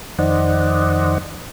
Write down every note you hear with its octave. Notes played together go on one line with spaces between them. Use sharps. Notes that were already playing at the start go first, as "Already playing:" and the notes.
F2 D#3 C5 D5 D#5 F#5